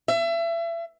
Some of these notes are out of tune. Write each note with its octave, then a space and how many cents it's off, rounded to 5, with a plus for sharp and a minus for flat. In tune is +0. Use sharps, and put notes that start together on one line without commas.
E5 +30